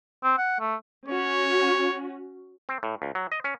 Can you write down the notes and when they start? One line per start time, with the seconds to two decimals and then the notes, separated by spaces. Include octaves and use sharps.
0.24 C4
0.38 F#5
0.60 A3
1.08 C#4 F#4 C#5
2.69 C4
2.83 A2
3.02 C#2
3.15 F#3
3.32 D#5
3.44 C#4